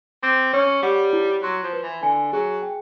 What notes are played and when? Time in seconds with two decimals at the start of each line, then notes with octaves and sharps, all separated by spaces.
0.23 C4 D6
0.53 C#4 C#5
0.82 G3 F#5
1.13 E4
1.42 F#3 C6
1.63 F3
1.73 B4
1.83 E3
2.02 D3 G#5
2.33 F#3 G#4
2.63 G5